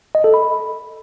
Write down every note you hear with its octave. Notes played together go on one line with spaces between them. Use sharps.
D#5
A4
B5